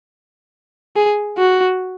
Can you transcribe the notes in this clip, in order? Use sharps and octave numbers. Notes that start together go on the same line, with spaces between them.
G#4
F#4